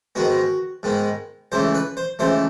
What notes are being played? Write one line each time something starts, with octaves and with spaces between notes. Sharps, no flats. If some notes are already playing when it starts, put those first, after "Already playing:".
G#2 D#3 G#3 B3 F#4
G#2 D#3 G#3 B3
C#2 C#3 E3 A3 C5
B4
C5
C#2 C#3 E3 A3 C5